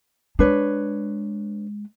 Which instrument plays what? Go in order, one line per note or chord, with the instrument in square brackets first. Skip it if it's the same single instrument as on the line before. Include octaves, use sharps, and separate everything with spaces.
[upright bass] G#3 [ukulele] D4 B4 C#5